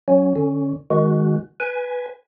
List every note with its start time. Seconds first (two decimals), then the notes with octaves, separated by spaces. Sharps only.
0.08 F#3 C#4
0.36 D3 C#4
0.90 D#3 G#3 F#4
1.60 B4 G#5